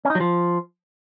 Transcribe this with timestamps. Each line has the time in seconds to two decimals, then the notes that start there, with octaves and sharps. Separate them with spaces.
0.05 C#4
0.10 D#4
0.15 F#3
0.20 F3